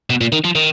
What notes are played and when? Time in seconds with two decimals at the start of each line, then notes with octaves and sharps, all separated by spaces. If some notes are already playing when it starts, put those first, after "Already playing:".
0.10 B2
0.21 A#2
0.32 D#3
0.45 F3
0.55 D#3